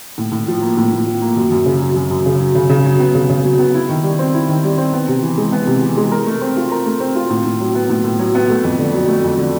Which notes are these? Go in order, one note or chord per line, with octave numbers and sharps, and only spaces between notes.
A2
A2
F3
A#3
A2
A2
F3
A#3
F#2
F#2
C#3
F#3
F#2
F#2
C#3
F#3
C#3
C#3
F#3
B3
C#3
C#3
F#3
B3
E4
D#3
G3
C4
E4
D#3
G3
C4
B3
C3
E3
G#3
B3
C3
E3
G#3
A#4
A3
C4
F4
A#4
A3
C4
F4
A2
A2
F#3
B3
A2
A2
F#3
B3
A3
F2
D3
F#3
A3
F2
D3